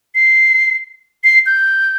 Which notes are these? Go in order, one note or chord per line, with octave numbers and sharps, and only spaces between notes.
C7
C7
G6